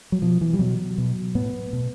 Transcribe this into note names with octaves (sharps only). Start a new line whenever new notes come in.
F#3
B2 F3
E3
G3
B2 F#3
B2
A2 B3
B2